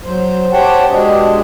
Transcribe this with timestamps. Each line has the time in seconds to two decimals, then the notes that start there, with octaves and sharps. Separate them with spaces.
0.04 F#3 C5
0.53 G4 C5 C#5 F#5 G5 A5
0.89 B2 G#3 D4 G4 G#4